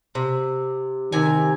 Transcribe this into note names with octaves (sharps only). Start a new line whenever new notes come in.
C3
C3 D#3 G#5